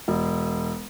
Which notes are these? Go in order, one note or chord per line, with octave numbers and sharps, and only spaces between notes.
E1